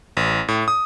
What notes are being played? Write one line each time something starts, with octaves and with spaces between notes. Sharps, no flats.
A1
A2
D#6